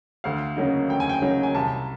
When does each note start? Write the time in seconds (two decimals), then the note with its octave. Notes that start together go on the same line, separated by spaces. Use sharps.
0.24 D2 F5
0.57 C#3 F#3 A#3 D#4
0.89 D2 G5
1.00 G#5
1.09 G5
1.22 C#3 F#3 A#3 D#4
1.43 G#5
1.55 C2 A5